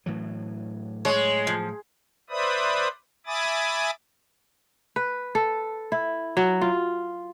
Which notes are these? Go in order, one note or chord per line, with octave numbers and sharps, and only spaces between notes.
A2 E3 F#3
G#3 C#5
F3
B4 C5 D5 E5 B5 D#6
E5 G#5 B5 D6 D#6 A6
B4
A4
E4
F#3
F4